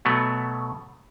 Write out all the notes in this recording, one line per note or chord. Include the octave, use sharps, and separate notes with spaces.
B2 F#3 A3 B3